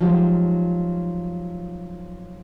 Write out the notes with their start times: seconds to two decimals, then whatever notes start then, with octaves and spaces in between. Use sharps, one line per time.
0.01 F3 F#3 G#3 D#4 G4